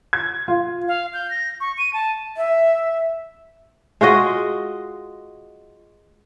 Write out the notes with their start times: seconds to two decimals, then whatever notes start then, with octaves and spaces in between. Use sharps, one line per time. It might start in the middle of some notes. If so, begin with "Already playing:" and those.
0.13 G#6
0.48 F4
0.88 F5
1.13 G6
1.30 A#6
1.61 C#6
1.78 D#7
1.94 A5
2.37 E5
4.01 G#3 F4 F#4 D#5